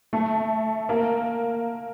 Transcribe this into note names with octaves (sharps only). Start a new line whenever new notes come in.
A3
A#3